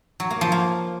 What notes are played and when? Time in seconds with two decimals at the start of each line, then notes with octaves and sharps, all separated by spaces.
0.20 F#3
0.30 A#3
0.41 F3
0.52 A#3